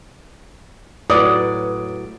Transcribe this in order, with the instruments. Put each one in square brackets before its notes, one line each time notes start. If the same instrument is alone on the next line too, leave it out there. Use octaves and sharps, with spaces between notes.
[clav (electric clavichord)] A2 F#3 [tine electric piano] B4 [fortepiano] D5 [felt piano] D#6